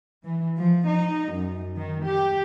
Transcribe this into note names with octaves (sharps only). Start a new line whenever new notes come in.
E3
F3
D#4
F#2
D#3
G4